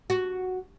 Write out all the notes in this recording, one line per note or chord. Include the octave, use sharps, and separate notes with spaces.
F#4